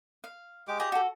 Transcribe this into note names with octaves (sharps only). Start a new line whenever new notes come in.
F5
G#3 G4 D6
F4 G4 G#4 D#5
F#4 A4